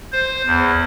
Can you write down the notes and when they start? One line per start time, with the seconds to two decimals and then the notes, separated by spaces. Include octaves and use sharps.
0.12 C5
0.46 E2